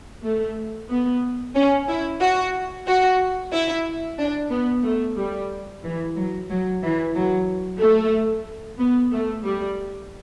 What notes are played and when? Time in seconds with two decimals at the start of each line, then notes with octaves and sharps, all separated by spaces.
0.24 A3
0.90 B3
1.55 C#4
1.88 E4
2.20 F#4
2.87 F#4
3.52 E4
4.18 D4
4.51 B3
4.84 A3
5.17 G3
5.83 E3
6.16 F#3
6.49 F#3
6.82 E3
7.15 F#3
7.80 A3
8.79 B3
9.12 A3
9.44 G3